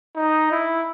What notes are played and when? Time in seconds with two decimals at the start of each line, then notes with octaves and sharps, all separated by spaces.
0.15 D#4
0.51 E4